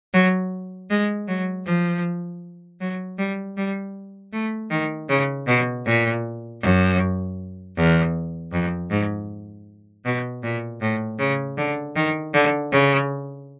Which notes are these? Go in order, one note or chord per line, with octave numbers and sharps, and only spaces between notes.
F#3
G#3
F#3
F3
F#3
G3
G3
A3
D#3
C#3
B2
A#2
F#2
E2
F2
G#2
B2
A#2
A2
C#3
D3
D#3
D3
C#3